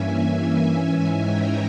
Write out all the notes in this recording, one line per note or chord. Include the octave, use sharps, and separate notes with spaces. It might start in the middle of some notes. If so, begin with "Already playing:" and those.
Already playing: G2 E3 A#3 C#4 E5 G#5
E5 G#5
G#2 E3 G#3 C#4
G5 A#5